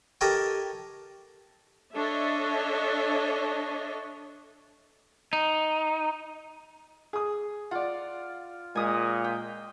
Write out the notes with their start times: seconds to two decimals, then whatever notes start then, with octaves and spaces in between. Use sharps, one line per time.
0.21 G4 A4 A#4 C#5 D#5 G5
1.95 D4 A4 C#5 D#5 E5
5.33 D#4
7.13 G#4 D#6
7.71 F4 D5 F#5
8.75 A#2 G#3 G#5 D#6
9.24 G5